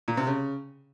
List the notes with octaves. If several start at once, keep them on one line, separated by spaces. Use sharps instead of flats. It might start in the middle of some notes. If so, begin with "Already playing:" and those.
A#2
C3
C#3